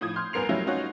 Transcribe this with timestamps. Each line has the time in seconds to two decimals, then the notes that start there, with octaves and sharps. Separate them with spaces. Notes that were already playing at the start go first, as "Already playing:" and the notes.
0.01 A2 F3 D#6 G#6
0.16 C6 F6 G6
0.33 D2 G2 B3 A#4 C7 F7
0.49 F#3 G3 A3 C#4 E4 F4
0.67 C#4 D#4 F4 F#4 C#5